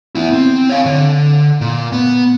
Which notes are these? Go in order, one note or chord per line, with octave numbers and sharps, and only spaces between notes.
B3 E4
C4
C#5 F5
D3
A#2
B3